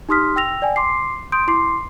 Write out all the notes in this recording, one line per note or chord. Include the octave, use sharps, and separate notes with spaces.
D#4 G4 C6 D#6 F6 B6
G5 E6 A#6 F7
D5 G5 G#5
C6 D6 C7
C6 D#6 G6 D7
E4 C6 D6 C7